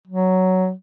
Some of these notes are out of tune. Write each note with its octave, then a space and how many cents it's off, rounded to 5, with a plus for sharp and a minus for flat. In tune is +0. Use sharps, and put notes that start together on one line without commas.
F#3 +5